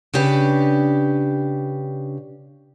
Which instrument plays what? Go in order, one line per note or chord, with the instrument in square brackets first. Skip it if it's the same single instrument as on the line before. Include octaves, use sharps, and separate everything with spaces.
[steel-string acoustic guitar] C#3 D4 G4 B4